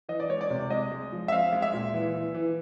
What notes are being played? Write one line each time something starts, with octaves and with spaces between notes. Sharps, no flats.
E3 D#5
D5
G#3 C#5
D5
C3
G#3 D#5
G#3
F3
E5
C4 F5
G#3
E5
A#2
E3
E3
E3